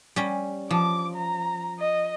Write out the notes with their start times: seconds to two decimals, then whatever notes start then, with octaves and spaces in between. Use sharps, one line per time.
0.16 G3 C#4
0.70 F3 D6
1.15 A#5
1.79 D#5